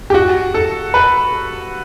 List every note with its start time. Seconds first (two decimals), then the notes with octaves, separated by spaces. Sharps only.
0.10 G4
0.14 F#4
0.54 A4
0.94 B4